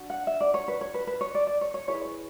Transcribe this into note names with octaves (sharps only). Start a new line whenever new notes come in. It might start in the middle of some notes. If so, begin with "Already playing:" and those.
Already playing: D4 F#4
F#5
E5
D5
C#5
B4
C#5
B4
B4
C#5
D5
D5
C#5
C#5
E4 G#4 B4 C#5
C#5